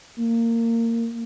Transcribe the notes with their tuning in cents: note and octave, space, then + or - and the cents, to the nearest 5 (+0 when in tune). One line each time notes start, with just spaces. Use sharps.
A#3 -20